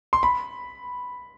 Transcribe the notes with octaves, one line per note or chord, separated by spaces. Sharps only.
C6
B5